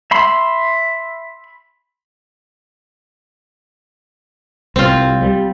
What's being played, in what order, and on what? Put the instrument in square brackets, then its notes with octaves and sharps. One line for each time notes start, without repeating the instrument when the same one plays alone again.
[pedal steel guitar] E5 B5 C6
[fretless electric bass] C2 [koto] C4 F4
[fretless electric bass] G3